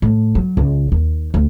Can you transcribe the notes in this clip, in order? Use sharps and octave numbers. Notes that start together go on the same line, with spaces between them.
A2
F#3
C#2
D#2
D2